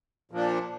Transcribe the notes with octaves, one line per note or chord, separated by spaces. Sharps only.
A#2 F3 A#3 D4